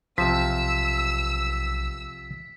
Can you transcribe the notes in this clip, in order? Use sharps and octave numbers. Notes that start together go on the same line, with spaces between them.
B1 C3 F3 E6 B6